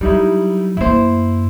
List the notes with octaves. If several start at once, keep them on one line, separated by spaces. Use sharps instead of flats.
F#3 G3 D#4 E4
F#2 A#3 E4 C5